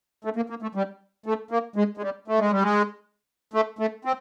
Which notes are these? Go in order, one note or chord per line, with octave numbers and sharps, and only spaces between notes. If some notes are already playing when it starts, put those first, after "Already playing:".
A3
A#3
A#3
A3
G3
A3
A#3
G#3
G#3
G3
A3
G#3
G3
G#3
A3
A3
C4